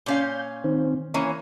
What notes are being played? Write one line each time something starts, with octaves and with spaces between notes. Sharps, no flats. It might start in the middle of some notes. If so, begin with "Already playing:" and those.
A#2 C#4 F5 G6
D#3 C4
E3 A#3 C#4 C#5